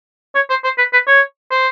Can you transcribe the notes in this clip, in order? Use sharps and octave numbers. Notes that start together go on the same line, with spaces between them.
C#5
C5
C5
B4
B4
C#5
C5